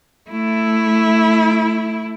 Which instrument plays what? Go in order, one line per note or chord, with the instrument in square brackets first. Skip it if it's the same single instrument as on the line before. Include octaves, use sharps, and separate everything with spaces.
[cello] A3 E4